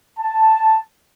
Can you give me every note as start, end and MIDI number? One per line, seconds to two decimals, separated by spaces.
0.19 0.80 81